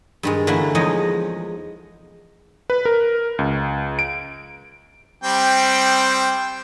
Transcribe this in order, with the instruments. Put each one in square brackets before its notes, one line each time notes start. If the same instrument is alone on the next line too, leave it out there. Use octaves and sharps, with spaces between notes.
[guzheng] G2 D#3 G#3
D3 E3 A3 A#3 E4
E2 F3 G#3 D#4 C#5 D#5
[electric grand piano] B4
A#4
C#2
D7
[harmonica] G3 C4 G5